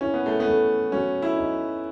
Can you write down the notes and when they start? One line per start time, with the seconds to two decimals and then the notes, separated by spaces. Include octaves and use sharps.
0.01 C#4 E4
0.14 B3
0.26 A3
0.40 B3
0.46 A3
0.92 F#3 C#4
1.22 E4
1.38 D#4